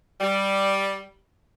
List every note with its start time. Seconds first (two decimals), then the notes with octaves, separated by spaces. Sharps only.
0.21 G3